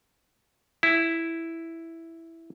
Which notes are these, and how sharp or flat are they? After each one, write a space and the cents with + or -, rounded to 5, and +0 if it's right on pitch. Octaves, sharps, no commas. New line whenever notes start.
E4 +0